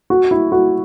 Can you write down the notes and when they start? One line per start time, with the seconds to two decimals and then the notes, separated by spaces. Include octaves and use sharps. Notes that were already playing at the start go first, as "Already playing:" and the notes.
0.10 F#4
0.31 E4
0.52 F#4